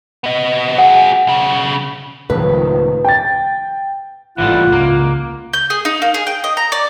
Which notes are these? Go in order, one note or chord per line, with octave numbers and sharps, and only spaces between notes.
B3 D#5
F#4 G#4 F#5
B1 C#3
C#2 A2 D#3 F3 B4
G5 A6
G#1 E3 G3 A3 F4 F#5
C#2 A#3
G6
G#4
D#4
A#3
G#4
G5
D#5
A#5
D5